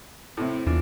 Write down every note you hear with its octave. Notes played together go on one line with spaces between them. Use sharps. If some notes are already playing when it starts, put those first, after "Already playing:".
A2 C3 E4
E2 E3 D4 F4